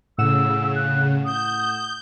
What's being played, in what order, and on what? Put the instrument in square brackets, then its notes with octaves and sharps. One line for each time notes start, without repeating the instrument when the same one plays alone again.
[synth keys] A2 F#5 E7 [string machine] C#3 [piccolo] E6
[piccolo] F#6
[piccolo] D#6 [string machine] G6